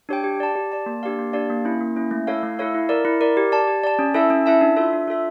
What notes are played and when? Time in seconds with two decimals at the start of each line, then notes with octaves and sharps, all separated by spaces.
0.09 D4 G4 C#5 G5
0.24 G4
0.40 D5 A5
0.55 G4
0.72 D5 A5
0.86 A#3
1.03 D4 G4 D5 F5
1.18 A#3
1.33 D4 G4 D5 F5
1.50 A#3
1.65 C#4 E4
1.81 A#3
1.96 C#4 E4
2.11 A3
2.27 E4 A4 C#5 F5
2.43 A3
2.59 E4 A4 C#5 F5
2.74 E4
2.89 A#4 D5
3.05 E4
3.21 A#4 D5
3.37 G4
3.52 D5 A5
3.68 G4
3.83 D5 A5
3.99 C#4
4.14 E4 A4 E5 A5
4.30 C#4
4.46 E4 A4 E5 A5
4.61 D4
4.76 F4 A4 E5
4.93 D4
5.08 F4 A4 E5